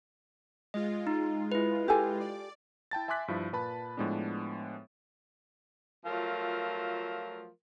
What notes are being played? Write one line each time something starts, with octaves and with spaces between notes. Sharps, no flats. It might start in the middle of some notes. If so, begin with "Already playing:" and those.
G#3 F4 D#5
D#4
E4 B4
G4 A4 G#5
D5
E4 G5 A5 A6
E5 G#5 C6 D6 F#6 B6
G2 F3 E4
A#2 B4 A5 B5
A2 F3 G#3 B3 D4
F3 F#3 A3 F4 A#4